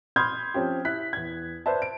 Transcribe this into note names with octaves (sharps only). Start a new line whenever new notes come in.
B5 C6 D#6 F6 G6 G#6
F3 C4 C#4 G4
E4 F#6 B6
E2 G#6
B4 C5 D5 E5 A5
D7